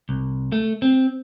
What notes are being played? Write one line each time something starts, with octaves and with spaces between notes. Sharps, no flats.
C2
A3
C4